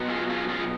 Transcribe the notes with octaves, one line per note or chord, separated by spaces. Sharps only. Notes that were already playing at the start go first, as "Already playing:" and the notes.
Already playing: B2 F#3 B3
F4 G#4
F4 G#4
F4 G#4